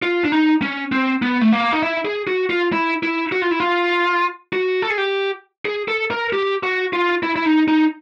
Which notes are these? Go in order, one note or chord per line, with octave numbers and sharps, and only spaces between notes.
F4
D4
D#4
C#4
C4
B3
A3
A#3
D#4
E4
G#4
F#4
F4
E4
E4
F#4
F4
E4
F4
F#4
A4
G#4
G4
G#4
A4
A#4
G4
F#4
F4
E4
E4
D#4
D#4